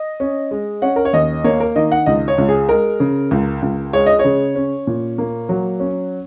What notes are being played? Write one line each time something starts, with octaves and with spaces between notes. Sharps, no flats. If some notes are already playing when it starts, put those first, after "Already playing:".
Already playing: D#5
C#4
G#3
C#4 F#5
A#4
C#5
D#2 D#5
A#3 C#5
A#4
D#3 D#5
F#5
C#2 D#5
C#5
C#2
G#4
G#3 A#4
C#3
C#2
C#2
G#3 C#5
D#5
C#5
C#3
C#4
A#2
A#3
F#3
C#4